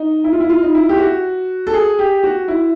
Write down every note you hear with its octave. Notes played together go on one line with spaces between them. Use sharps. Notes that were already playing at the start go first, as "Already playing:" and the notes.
Already playing: D#4
E4
F4
E4
F4
D#4
E4
G4
F#4
A4
G#4
G4
F#4
E4